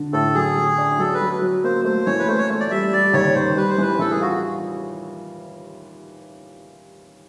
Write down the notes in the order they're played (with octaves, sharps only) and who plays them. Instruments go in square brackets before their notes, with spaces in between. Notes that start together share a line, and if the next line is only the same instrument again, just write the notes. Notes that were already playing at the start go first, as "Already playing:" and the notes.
Already playing: [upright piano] D3
[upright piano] A2 [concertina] A4
[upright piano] F#3 [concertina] G#4
[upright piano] F#3
D4
[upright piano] F#3 [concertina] A4
[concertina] B4
[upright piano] F#3
F#3
[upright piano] A#3 [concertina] C5
[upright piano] A3 [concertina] C5
[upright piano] E3 [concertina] C#5
[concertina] B4
[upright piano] A3 [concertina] C5
[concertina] C#5
[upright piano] A3
[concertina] D5
[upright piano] G3 [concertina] E5
[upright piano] G3 [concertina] D5
[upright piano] D#2 [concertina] C#5
[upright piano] D#2 [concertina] C5
[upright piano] G3 [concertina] B4
[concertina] C5
[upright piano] E3 [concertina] B4
[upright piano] E3 [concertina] A4
[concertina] G#4
[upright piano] F4 [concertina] F#4